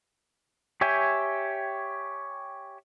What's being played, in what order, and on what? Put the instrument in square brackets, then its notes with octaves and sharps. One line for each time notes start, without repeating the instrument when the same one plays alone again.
[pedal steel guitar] G4 C#5 E5 G5 G#5